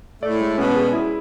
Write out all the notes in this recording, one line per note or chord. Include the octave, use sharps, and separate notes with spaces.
A2 A3 D5
G#3
B2 B3 C#4
G#4
E4